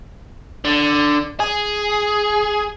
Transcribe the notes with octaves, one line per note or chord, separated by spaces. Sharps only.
D3
G#4